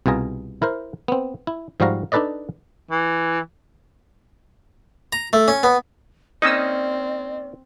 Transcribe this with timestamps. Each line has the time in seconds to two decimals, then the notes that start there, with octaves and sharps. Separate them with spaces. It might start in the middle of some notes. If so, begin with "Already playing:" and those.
0.06 C2 B2 F4 G#4 A#5
0.62 E4 A#4 C5
1.08 B3 C4
1.47 E4
1.80 G#2 F3 G3 F#4 F5 A#5
2.12 D4 D#4 A4 B4 D5 D#5
2.91 E3
5.13 A#5
5.33 A3
5.48 C#4
5.63 B3
6.42 A#3 C4 C#4 D#4 D5 D#5 E6